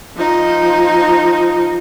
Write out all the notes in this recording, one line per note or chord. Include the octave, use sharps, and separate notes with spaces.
F3 D#4